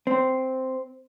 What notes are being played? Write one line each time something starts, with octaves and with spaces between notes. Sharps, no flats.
C4